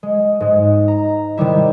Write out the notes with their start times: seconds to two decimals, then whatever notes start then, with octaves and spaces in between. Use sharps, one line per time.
0.03 G#3
0.40 G#2 G#3
0.88 A#5
1.37 C3 D#3 G3 E4